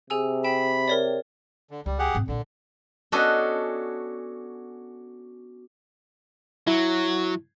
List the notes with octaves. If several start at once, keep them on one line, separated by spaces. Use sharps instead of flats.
C3 G#4 G#5 E6
G5 B5 E7
A#4 C#5 D5
D3
C#2 G3
G4 G#4 F#5
G#2 C4
A#1 A#2 D3
B3 C#4 D4 F#4 A4 D#5
F#3 E4